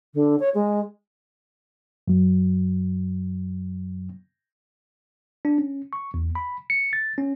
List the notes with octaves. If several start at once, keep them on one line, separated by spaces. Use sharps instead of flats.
D3
C#5
G#3
F#2 F#3
D4
C#4
C#6
E2
B5
C#7
A6
C#4